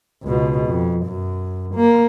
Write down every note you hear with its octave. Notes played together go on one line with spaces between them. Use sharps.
C#2 B2
F2
F#2
A#3